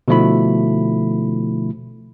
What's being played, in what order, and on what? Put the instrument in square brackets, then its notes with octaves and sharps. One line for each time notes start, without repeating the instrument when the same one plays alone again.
[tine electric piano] B2 D3 F3 A3 E4 B5